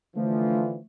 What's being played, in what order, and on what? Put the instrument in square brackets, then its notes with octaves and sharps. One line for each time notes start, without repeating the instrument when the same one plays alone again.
[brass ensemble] D3 E3 F3 [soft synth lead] A3